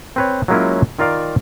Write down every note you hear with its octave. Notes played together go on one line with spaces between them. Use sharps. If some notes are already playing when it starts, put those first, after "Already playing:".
C4 B4 C#5
F#3 G#3 A#3 C#4 E4 F4
D#3 F4 A#4 D5 F5